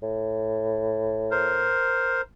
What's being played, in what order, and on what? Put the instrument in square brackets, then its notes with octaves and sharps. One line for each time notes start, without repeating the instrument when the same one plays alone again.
[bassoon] A2
[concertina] A#4 C5